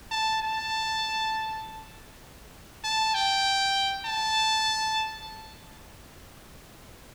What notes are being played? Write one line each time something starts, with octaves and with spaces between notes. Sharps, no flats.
A5
A5
A5
G5
A5